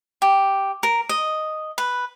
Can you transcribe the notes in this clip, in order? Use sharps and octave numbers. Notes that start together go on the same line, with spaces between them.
G4
A#4
D#5
B4